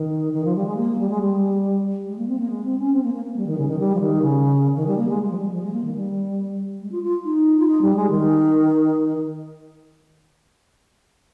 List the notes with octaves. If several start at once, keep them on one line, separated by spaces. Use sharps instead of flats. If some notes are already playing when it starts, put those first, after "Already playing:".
Already playing: D#3
D#3
F3
G3
G#3
A#3
G3
G#3
G3
G#3
A#3
C4
A#3
G#3
C4
C#4
C4
A#3
A#3
A#3
G3
D#3
C#3
D#3
G3
F3
D#3
C#3
D#3
G3
A#3
G#3
G#3
F3
G3
F3
G#3
A#3
D#3
G3
G#3
F4
F4
D#4
F4
D#4
G3
G#3
D#3